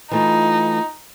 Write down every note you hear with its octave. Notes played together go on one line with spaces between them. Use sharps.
E3 A3 D#4 F4